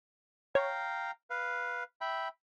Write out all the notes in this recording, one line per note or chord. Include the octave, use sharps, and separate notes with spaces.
C#5 F5 G5 A#5
B4 F5
E5 G5 B5